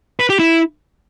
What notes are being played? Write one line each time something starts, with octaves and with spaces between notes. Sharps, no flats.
B4
G4
E4